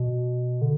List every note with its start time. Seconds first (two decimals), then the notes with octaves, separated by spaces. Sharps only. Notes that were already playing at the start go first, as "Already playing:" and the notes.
Already playing: B2
0.62 D3